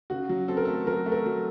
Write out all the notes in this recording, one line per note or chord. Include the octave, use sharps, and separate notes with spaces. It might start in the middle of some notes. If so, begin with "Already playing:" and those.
C#3 F#4
F#3
C4 A4
A#4
A3 A4
F#3 A#4
A3
A#4
F#3